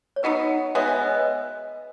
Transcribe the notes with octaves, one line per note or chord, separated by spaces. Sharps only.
C#5
F#3 B3 D#4 B4 D#5
B2 G#3 B3 C#5 E5
E5 G#5
B4
B4 D#5